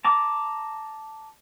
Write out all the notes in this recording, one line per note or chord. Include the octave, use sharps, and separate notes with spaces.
A5 A#5 D6